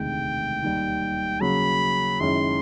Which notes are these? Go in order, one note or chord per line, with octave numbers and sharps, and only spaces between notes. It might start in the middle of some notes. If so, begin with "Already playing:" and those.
Already playing: E1 D2 C3 D#3 G#3 G5
D#2 D#3 G3
C#3 F#3 A#3 B5
F#2 D#3 G#3 C#4 E4 C6